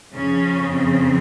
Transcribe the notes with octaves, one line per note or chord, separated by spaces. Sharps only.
F2 C#3 F3 C#4
C4